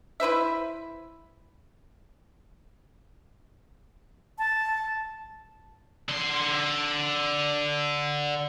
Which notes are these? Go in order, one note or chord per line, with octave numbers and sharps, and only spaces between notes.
E4 B4 C5 E5
A5
D3 C6